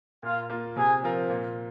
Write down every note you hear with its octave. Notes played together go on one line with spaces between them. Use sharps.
A#2 F4 F5
A#3 F4
C3 G#4 G#5
F3 C4 F4 A#4
A#2